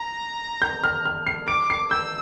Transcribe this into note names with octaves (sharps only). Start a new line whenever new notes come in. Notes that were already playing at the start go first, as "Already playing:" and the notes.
Already playing: A#5 A#6
G6
F6
F6
C7
D6 D7
C7
E6 G6